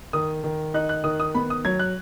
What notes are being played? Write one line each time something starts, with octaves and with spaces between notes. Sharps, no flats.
D#3 D#6
D#3
D#4 F#6
F#6
D#3 D#6
D#6
B3 B5
D#6
F#3 G#6
F#6